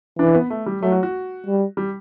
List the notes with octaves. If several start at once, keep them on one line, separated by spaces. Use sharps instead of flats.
E3 D4
B3
A3
G3
F#3 A3
F#4
F#4
G3
G3